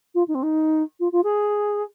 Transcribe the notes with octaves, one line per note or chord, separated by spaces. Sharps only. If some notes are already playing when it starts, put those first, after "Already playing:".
F4
D#4
C4
D#4
F4
F4
G#4